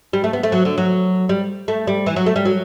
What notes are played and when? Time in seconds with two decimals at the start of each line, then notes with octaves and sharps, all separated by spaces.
0.13 G3
0.24 A3
0.33 B3
0.43 A3
0.52 F#3
0.65 D3
0.78 F#3
1.29 G3
1.68 A3
1.87 G3
2.06 E3
2.16 F#3
2.26 A3
2.36 G3
2.45 F#3